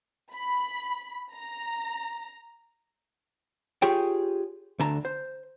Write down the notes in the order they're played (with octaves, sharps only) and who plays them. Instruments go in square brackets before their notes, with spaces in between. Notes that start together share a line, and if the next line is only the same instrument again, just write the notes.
[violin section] B5
A#5
[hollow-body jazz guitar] F4 G4 G#4 C#5 G5
D2 D3 A5 A#5
C5